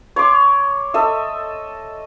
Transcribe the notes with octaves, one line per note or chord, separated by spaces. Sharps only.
C#5 C6 D6
A4 D#5 E5